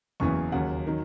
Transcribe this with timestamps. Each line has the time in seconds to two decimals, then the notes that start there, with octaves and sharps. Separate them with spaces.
0.20 F#1 E2 C#3 E3 C#6
0.52 D#2 C#3 F#3 F#5
0.87 D#3 F#3